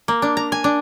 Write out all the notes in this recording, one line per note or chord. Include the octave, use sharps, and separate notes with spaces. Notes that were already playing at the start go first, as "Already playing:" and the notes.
A#3
D4
A#5
G#5
D4